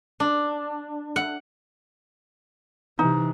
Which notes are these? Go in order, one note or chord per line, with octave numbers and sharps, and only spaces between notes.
D4
F#5
C3 E3 D#4